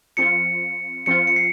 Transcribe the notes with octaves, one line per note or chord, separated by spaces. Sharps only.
F3 C4 F4 C#7
F3 C4 F4 C#7
C#7
C7